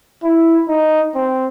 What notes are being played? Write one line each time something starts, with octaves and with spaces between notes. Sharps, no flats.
E4
D#4
C4